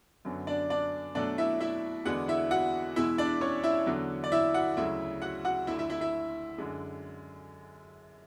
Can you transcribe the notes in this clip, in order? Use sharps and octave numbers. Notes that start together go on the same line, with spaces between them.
F#2 D3 F#3 B3
D4 D5
D4 D5
B2 F#3 A3 D4 D5
E4 E5
E4 E5
E2 D3 G#3 B3 D4 F#4 F#5
E4 E5
F#4 F#5
E2 B2 G#3 E4 E5
D4 D5
C#4 C#5
E4 E5
E2 D3 F#3
D5
E4 E5
F#4 F#5
D2 C#3 F#3 E4 E5
F#4 F#5
F#4 F#5
D2 D3 A3 E4 E5
E4 E5
E4 E5
E4 E5
F#2 D3 G#3